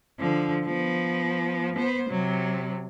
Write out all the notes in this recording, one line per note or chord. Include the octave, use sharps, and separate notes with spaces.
D3 F3
F3 B3
B3 C5
C3 F#3